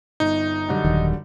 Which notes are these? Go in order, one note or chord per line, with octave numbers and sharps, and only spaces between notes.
G1 D#4
F#2 D3 G3
D#1 D#3